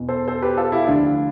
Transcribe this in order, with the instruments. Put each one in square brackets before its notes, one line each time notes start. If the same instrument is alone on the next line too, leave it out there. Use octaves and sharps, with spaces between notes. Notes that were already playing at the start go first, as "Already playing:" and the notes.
Already playing: [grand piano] E2 B2
A4 C5
A4 C5
G4 B4
F4 A4
E4 G4
D2 D3 F3 D4 F4